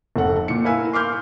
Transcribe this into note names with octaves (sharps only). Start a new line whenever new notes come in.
F1 A4 F#5
A#2 C#7
E4 A#4 B4 F5 G#5 E6
C6 D6 F6 G6